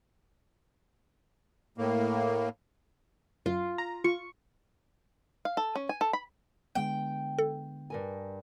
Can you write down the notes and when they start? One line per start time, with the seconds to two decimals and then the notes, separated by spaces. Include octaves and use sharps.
1.78 A2 A#3
3.46 F#2 F4
3.78 A#5
4.04 F4 C#6
5.45 F5
5.57 A4
5.75 C#4
5.89 G#5
6.01 A4
6.13 B5
6.75 D3 G#3 B3 G5
7.39 A4
7.90 G2 A#4 G#5